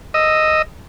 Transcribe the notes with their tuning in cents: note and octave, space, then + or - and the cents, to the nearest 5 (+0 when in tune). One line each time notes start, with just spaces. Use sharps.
D#5 +0 E6 +0